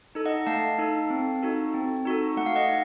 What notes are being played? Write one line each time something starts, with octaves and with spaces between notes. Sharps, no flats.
D#4 A4
D#5 F#5
A3 F5 A5
D#4 A4
C4
D#4 F#4 A4
C4
D#4 F#4 A4
A3 F#5
F5
D#5 F#5
D#4